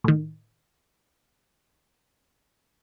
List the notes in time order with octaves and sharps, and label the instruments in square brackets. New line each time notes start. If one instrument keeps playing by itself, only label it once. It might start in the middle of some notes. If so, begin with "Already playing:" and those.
[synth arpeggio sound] A2 D#3